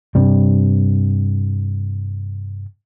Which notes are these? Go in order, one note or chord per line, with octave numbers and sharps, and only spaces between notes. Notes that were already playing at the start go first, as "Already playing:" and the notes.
G2 C3 G3